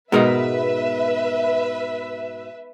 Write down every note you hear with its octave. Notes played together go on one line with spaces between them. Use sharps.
G#2 B2 B3 A#4 B4 D#5 E5